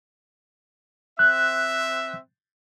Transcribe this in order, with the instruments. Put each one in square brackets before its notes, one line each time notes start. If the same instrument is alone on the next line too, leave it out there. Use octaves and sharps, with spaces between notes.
[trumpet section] C4 E5 [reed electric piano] F#6